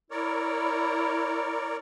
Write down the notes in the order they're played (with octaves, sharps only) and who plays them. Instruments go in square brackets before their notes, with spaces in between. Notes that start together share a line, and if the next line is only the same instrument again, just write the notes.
[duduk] E4 [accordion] A#4 C#5 D5